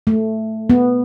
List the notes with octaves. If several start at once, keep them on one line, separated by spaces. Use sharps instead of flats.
A3
B3